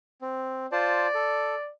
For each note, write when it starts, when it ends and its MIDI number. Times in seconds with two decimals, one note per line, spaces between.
0.21 0.66 60
0.72 1.07 65
0.72 1.07 72
0.72 1.70 74
0.72 1.07 81
1.14 1.55 69